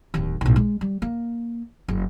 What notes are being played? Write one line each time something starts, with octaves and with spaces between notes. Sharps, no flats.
D1 D#2
B1 A2
G#3
G3
A#3
F#1